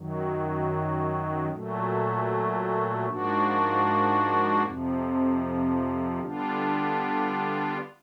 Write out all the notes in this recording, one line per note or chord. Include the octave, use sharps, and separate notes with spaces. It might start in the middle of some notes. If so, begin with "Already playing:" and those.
Already playing: F#2 D#3 F#3
A#2 F#3 A3
G#2 F3 A#3 D4 F#4
F2 C3 F3
D3 G3 B3 D4 F4